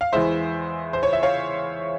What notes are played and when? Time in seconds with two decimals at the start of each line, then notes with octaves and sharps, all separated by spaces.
0.01 F5
0.12 E2 E3 G#3 C5 E5
0.93 C5
1.03 C#5
1.13 E5
1.23 C#5 F5